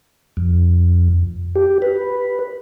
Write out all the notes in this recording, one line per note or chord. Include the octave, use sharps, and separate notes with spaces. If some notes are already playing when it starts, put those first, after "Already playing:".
F2
G4
B4